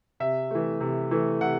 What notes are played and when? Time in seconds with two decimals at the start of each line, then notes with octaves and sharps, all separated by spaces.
0.20 C3 E5
0.51 E3 A3
0.80 C3
1.11 E3 A3
1.41 C3 F#5